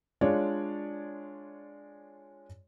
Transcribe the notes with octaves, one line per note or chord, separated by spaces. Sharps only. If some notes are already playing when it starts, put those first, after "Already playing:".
G#3 D4 F4 C#5 D5